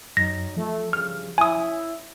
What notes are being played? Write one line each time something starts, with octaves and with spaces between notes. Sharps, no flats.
F#2 F#3 D#4 A#6
F3 A3
G2 C#3 F6
C#4 E4 G#5 D#6